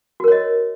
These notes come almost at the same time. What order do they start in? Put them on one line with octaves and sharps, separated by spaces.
F#4 A#4 C#5 D#5